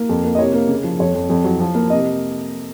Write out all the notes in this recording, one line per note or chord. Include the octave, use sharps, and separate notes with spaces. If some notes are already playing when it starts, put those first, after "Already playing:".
Already playing: A#3
F2
A#3
D#5
C3 C#5
A#3
C#3
F3
F2 C#5
F2
F2
F#3
F3
A#3
C3 D#5